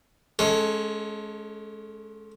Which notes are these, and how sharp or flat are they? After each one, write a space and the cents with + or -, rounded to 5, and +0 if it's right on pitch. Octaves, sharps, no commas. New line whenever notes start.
G#3 +25 C#4 +0 A4 +0